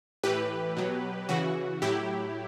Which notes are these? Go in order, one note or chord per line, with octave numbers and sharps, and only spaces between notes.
A2 E3 G4 B4
B2 F#3
C#3 E3 F#4
A2 F#3 E4 G4